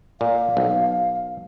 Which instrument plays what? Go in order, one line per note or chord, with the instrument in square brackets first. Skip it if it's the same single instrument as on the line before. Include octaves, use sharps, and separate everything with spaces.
[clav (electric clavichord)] A#2 [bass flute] F5
[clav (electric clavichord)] B1